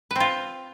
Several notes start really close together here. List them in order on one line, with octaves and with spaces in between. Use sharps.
B4 C4 F4